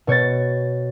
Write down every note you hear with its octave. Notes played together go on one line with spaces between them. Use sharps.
B2 C#5 G6 A6